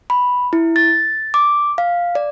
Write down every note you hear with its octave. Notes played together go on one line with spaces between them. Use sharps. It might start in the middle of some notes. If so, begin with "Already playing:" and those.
B5
E4
A6
D6
F5
D5